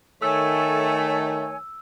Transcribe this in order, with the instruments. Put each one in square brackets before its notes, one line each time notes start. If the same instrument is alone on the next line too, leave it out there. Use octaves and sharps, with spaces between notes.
[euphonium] D#3 [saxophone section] A3 [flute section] C#5 G#5 [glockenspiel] E6